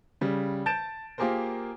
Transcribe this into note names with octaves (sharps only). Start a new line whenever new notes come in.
C#3 G3
A5 G6 A6 D7 E7
A#3 F4 G4 G#4 A#4 C5